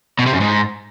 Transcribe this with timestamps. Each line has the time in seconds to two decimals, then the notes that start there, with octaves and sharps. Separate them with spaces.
0.19 B2
0.26 C3
0.33 F#2
0.40 G#2